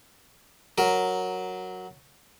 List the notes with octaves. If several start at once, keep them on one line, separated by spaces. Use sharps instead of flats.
F#3 A#4